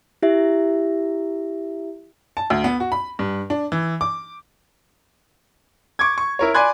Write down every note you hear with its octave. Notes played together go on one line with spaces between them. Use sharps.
E4 G4 E5
A5
D2
B3
F#4
B5
G2
D4
E3
D6
C#6 D6 G#6
C#6
E4 A#4 C#5
D5 G#5 B5 C6 F#6 G#6